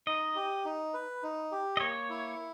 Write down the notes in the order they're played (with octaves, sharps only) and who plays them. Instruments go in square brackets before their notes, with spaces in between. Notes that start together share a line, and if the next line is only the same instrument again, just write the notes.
[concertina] D#4 [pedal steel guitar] D#5
[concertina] G4
D#4
B4
D#4
G4
[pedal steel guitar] D#5
[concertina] A#3 [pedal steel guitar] C#5
[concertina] E4